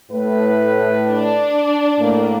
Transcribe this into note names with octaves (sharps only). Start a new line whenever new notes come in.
A2 B4
D4
A2 A#3